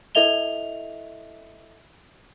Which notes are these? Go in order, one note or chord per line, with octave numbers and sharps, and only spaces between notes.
E4 A4 D#5 E5 F7 G7